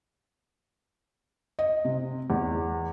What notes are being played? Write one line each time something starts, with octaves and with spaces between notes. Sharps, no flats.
D#5
C3
E2